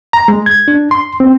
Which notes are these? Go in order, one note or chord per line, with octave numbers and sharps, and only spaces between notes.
A#5
G#3
G#6
D4
C6
C4